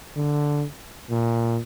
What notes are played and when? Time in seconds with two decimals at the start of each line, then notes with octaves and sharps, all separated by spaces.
0.17 D3
1.10 A#2